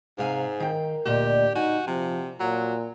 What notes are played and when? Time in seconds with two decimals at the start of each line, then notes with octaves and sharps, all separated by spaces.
0.19 G#2 C3 F5 G#5
0.60 D#3 A#4 G5
1.06 D2 A#2 G4 D#5
1.55 D#4 F#4 G#5
1.87 C3 F3
2.40 A#2 F#3